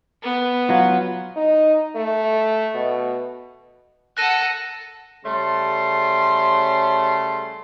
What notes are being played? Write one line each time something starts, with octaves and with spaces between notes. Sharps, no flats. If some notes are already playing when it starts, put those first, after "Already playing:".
B3
F#3 F4 F#4
D#4
A3
B2
A4 F#5 F#6 A#6 D#7
C#3 G3 A3 C#4 A5 C6